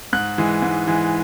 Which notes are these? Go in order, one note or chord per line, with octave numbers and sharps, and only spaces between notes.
G#2 F#6
E3 G#3
G#2
E3 G#3